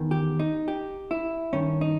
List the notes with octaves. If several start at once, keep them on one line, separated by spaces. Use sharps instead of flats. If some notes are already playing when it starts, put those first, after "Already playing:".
Already playing: E2 D#3
G4
D#4
G4
E4
G2 D#3 C#4
D#4